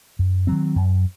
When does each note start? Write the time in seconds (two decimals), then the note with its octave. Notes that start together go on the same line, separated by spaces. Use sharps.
0.19 F#2
0.47 D#3 F#3 C4
0.76 F#2